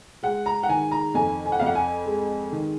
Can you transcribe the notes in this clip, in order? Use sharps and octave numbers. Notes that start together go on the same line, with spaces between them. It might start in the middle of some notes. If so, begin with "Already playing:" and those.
G#3 F#5
A#5
F#5
D#3 G#5
A#5
F2 G#5
G#5
F#5
F2 F5
F#5
G#5
G#3
D#3